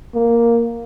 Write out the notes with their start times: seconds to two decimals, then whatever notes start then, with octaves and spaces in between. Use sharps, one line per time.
0.15 A#3